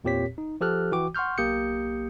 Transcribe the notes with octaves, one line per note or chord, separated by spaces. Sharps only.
E2 A#2 C4 G4 C#5 B6
D#4
F3 G4 A4 F6 F#6
E3 F#4 G5 D6
F#5 C6 C#6 F6 G6
B1 A#3 G4 D#6 G6 C#7